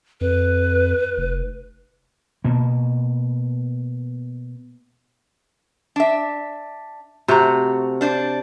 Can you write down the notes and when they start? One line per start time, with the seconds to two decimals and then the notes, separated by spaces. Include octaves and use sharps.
0.21 F2 B4
1.18 F1
2.44 B2 A#3
5.96 D4 E5
7.28 C3 A3 F#4 A#5
8.01 D4 C5 D5